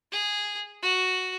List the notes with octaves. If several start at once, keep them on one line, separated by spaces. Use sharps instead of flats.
G#4
F#4